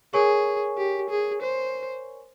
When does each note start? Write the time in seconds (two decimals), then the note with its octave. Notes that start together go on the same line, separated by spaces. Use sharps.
0.14 G#4 A#4 C#5 G#5 C#6
0.77 G4
1.10 G#4
1.42 C5